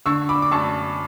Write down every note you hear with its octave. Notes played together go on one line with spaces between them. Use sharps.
D3 C#6 E6
B5 D6
D6
F#2 A5 C#6